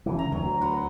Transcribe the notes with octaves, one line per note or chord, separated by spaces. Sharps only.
C#3 E3
A#5
D2 F#3
B4 F#5 C6